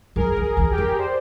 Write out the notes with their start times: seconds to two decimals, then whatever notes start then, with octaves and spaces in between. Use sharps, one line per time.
0.16 F#2 G#4 A#4
0.36 F2
0.43 G#4
0.57 E2 G#4
0.71 G4
0.78 F2
0.84 G#4
0.98 C5 D5